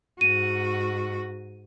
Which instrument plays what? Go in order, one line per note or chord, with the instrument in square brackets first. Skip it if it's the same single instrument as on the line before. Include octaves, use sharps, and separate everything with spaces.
[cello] G#2 F#4 [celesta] D#7